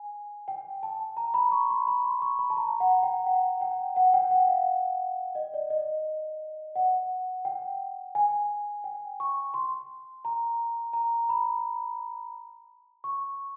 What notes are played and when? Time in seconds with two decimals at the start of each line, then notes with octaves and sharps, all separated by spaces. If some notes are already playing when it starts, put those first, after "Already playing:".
Already playing: G#5
0.48 G5
0.83 A5
1.17 A#5
1.34 B5
1.52 C#6
1.70 C6
1.88 B5
2.04 C6
2.22 C#6
2.39 B5
2.50 A5
2.57 A#5
2.80 F#5
3.03 G5
3.27 F#5
3.61 G5
3.96 F#5
4.14 G5
4.31 F#5
4.48 F5
5.35 D#5
5.54 D5
5.70 D#5
6.76 F#5
7.45 G5
8.15 G#5
8.84 G5
9.20 C#6
9.54 C6
10.25 A#5
10.93 A#5
11.29 B5
13.04 C#6